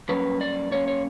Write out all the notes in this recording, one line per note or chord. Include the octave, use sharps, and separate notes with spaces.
G2 F#3 A#3 C#4 B4
D5
F#2 D3 A#3 C#4 C#5
C#5